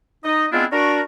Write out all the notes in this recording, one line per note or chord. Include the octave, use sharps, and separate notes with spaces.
D#4 D#5
G#3 B3 C4 D4 E4 F4
D4 F#4 A#4